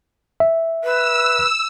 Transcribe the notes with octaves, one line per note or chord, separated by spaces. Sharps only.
E5
B4 E6